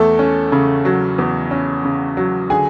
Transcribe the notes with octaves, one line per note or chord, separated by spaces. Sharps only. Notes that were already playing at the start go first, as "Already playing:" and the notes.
Already playing: E2 A3 A4
C#4
C#3
F#3
E2
C#4
C#3
F#3
D3 G#4 G#5